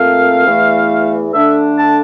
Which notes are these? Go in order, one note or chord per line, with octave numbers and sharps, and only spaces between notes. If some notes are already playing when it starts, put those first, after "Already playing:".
Already playing: A#2 A3 C4 F5
E2 E3 A3
D3 A3 D4 E5
A5